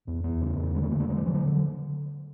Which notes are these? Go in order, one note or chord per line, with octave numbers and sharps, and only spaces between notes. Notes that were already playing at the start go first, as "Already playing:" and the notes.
E2
E2 B3
C#3
E2
D3 G#3
A3
D3 A#3
A3
D3 G#3
F#3
D3 F3
F#3